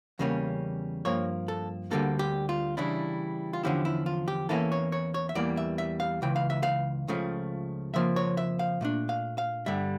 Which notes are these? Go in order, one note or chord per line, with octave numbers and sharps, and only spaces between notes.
E2 C#3 G3 A#3 C#4
G2 F3 A#3 C#5
A4
D2 D3 G3 A#3 A4
G4
F4
C#3 E3 G3 D4 E4
F4
E2 D3 F3 C#4 E4 G4
E4
F4
G4
E2 E3 A#3 C#4 E4 A4
C#5
C#5
C#5
E5
E2 E3 G3 A#3 D5
E5
E5
F5
C#2 C#3 E3 G5
F5
E5
F5
C#2 C#3 F3 A3
F2 C#3 F3 A#3 E5
C#5
E5
F5
A#2 A3 D4
F5
F5
G2 D3 G3 E5